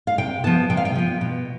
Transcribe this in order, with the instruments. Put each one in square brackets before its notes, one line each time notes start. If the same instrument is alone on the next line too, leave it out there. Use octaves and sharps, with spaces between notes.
[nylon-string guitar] F5
C3 G5
F3 B3 A5
C3 G5
F5
G5
F3 B3
B2